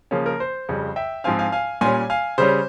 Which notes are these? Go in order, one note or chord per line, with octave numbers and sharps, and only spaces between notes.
C#3 F3 A#3 C#4
A#4
C5
F2 C#3 G3
E5 G5
G#2 F3 C4 F5 G#5
F5 G#5
F5 G#5
A#2 G3 C#4 G#5 C6
F5 G#5
C#3 G3 C#4 C5